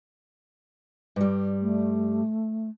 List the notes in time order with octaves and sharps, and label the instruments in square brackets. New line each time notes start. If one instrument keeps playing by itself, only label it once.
[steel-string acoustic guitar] G2 G3
[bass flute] A3